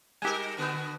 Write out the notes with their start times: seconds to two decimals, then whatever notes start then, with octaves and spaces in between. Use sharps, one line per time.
0.22 G3 D#4 G4 A#4 G#5
0.57 B2 D3 B3